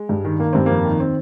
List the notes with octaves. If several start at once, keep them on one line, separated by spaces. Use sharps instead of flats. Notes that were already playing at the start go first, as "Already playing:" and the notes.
Already playing: G#3
G2
D#3
D#3 A#3
G2 C4
F2 A#3
D#3
C4